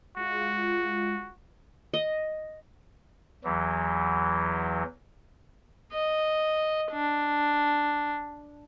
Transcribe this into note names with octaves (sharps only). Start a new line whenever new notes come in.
G#3 F4 F#4
D#5
E2 E3 F#3
D#5
D4